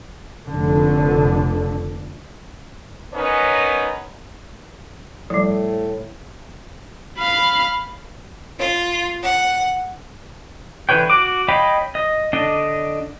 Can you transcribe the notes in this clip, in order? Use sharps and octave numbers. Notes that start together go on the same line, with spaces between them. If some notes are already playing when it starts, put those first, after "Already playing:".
F1 D3
B3 C#4 D#4 A#4 B4 C#5
A2 F3 G3
F5 B5
F4
F#5
D3 E3 B4 C#5 G5
F#4 D6
C#5 D#5 F5 G5 B5
D#5
D3 D4 D#5